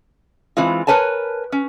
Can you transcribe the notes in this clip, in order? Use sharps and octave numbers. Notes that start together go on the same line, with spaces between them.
E3 G#3 C4 F4
A#4 B4 C#5 G#5 A5
C#4